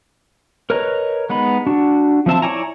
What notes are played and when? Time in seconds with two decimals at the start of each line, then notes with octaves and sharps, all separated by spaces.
0.70 A#4 B4 C#5 D#5 A#5
1.29 G#3 B3 D#4 B5
1.67 D4 F#4
2.26 F3 C4 E5 A5
2.42 E4 C#5 D5 G#5 A#5